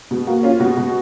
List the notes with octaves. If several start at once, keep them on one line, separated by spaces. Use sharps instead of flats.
B2
A#3 F#4
C#4 F4
B2 F#4
B2 F#4